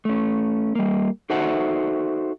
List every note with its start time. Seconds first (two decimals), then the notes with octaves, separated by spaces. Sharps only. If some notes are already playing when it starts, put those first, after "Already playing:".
0.05 A3 C#4
0.75 G3 A#3
1.30 D#4 F#4 A4 C5 E5 F#5